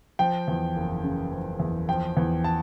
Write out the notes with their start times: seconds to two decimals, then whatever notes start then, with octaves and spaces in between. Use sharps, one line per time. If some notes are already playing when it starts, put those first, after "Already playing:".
0.19 F3 G5
0.48 E2
0.76 F#1
1.03 C#3
1.32 F3
1.60 E2
1.89 F3 G5
2.17 E2
2.44 A5